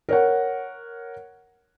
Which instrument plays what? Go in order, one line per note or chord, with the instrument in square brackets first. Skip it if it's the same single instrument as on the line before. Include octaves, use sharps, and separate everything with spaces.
[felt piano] A#4 C#5 F#5